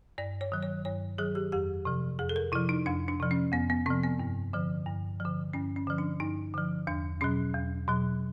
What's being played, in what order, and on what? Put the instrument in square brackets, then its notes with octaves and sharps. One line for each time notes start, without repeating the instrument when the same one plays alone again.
[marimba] G2 D5
C#5
D#3 F#3
C#5
G2 C#5
D#3 F#3 G#4
G4
F2 G4
C3 F3
F2 G#4
A4
A#4
C3 E4
F3
D#4
F2 D4
D4
C3 F3
C#4
F2 B3
B3
C3 F3 C4
B3
G2
D3 F3
G2
D3 F3
G2 C#4
C#4
D3 F3
D4
G2 D#4
D3 F3
E2 D4
B2 F#3 C#4
E2
B2 F#3